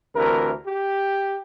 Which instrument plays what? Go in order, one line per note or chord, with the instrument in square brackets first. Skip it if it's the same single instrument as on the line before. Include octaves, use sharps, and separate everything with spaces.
[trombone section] D2 C3 E3 A#4
G4